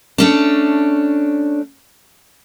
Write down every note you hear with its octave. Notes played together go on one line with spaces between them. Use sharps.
A3 C#4 D4